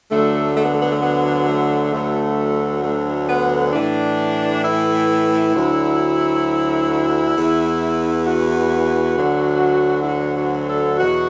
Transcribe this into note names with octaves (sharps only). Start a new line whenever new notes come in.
D2 D3 F#3 A3
A3
B3
A3
B3
A3
B3
A3
D2 D3 F#3 A3
A3
B3
A2 E3 D4
E4
D2 D3 F#3
E2 E3
F#4
D2 D3 F#3
E4
F#4
F#4
A4
E2 B2 F#3 F#4